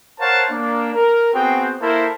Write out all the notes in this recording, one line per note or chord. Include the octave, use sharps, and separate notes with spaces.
A#4 C5 C#5 F5 F#5 A5
A#3 D4
A#4
B3 C4 F#4 G#4 G5
A#3 E4 A4 A#4 C5